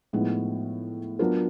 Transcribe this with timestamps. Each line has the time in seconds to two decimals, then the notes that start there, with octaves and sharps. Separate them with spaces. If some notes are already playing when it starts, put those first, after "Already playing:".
0.13 A2 F3 G#3 B3 D#4
1.19 F#3 B3 D4 F4 A#4